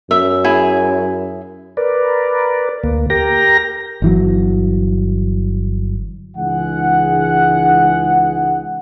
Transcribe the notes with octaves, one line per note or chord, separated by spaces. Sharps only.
F#2 E5
E4 G#4
A#4 B4 D5
D2 A#3
G4 A#4 G5 A#5 A#6
G1 E3 F#3
C#2 E3 G#3 D#4 G#4 F#5